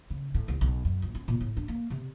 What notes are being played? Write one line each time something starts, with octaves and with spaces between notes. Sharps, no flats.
C#3
A2
C2
B1
F#2
A#1
C#4
A#2
A2
D4
A#3
C3